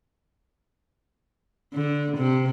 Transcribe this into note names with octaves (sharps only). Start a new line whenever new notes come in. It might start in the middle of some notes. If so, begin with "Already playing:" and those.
D3
C3